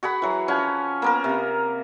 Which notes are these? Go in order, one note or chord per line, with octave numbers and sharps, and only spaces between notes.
F#4 G#4 F#5 B5
E3 F#3
F3 C#4 F#5 G#5
A#3 B3 A#4
C3